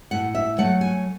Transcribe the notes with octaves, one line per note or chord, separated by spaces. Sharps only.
A2 F#5
E5
F#3 A3 F#5
G#5